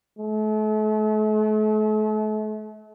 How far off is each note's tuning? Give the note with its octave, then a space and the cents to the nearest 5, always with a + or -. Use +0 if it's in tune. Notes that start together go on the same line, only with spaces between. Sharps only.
A3 -40